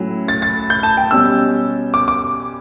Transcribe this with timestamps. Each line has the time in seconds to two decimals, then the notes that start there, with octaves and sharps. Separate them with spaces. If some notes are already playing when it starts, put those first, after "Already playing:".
Already playing: A2 F#3 C#4 E4
0.28 A6
0.42 A6
0.70 G6
0.83 A5
0.97 G5
1.11 B2 G3 C#4 E6
1.94 D6
2.08 D6